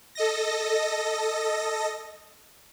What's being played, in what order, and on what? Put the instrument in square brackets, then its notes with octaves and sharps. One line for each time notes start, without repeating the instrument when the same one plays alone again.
[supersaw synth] A4 D#5 A#6